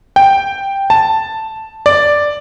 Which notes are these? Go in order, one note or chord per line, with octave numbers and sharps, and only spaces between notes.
G5
A5
D5